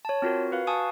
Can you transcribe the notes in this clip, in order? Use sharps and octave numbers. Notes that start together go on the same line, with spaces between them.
C#5 A5
C4 F4 F#4 A#4
F#4 B4 F5
F5 G#5 A5 C#6 D#6